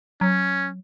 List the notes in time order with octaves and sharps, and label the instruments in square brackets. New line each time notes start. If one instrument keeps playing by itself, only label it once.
[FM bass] F#3 [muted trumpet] C#4